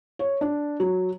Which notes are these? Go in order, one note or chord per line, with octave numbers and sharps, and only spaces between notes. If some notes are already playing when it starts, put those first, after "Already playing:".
C#5
D4
F#3